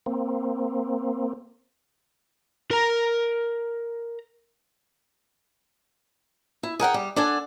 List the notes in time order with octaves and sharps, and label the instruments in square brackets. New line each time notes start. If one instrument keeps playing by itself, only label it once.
[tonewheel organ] A#3 C4
[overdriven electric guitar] A#4 A#5
[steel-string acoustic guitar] E4
G#4 A#4 F#5 G5
G3
D4 A4 F#5 G#5